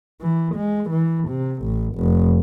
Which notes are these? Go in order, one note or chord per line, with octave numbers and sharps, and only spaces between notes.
E3
G#3
E3
C3
A1
F1